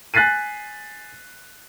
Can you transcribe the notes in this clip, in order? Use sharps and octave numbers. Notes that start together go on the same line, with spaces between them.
G#5 F#6 A6 B6 C7 D#7